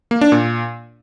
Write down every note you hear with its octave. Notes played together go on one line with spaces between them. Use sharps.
A#3
D4
A#2